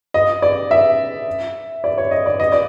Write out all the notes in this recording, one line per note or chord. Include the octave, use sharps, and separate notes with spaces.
D#5
D5
E5
D5
C#5
D#5
D5
D#5
D5